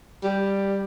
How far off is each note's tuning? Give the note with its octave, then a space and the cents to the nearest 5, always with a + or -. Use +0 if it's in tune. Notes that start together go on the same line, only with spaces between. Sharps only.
G3 +5